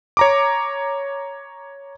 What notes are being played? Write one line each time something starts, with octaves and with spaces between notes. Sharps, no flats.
C#5 A#5 D6